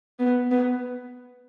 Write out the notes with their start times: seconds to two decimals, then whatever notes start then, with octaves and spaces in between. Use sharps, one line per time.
0.19 B3
0.51 B3